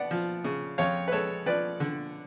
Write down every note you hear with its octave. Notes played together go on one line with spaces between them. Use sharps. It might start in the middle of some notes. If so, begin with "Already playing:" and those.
Already playing: B3 D5 F#5
F3
C#3
F2 C#5 F5
B4
G#3 A4 C#5
F3 B4 D5
D3